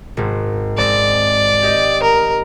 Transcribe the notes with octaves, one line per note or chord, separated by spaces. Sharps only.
G#1 G#2
G#3 C4 D5
G4 D#5
A#4